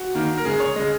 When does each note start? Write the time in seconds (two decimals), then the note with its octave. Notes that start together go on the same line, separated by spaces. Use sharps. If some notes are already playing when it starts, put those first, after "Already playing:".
Already playing: F#4
0.15 D#3 A#3
0.37 A#4
0.45 C#3 G#3 G#4
0.60 C#5
0.76 C#3 G#3 D#5